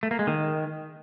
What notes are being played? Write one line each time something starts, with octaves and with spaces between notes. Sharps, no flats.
A3
A#3
G#3
D#3